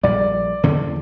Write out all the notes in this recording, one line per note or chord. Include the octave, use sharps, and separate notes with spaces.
A#1 A#2 G3 D5
E2 D3 A#3 C#4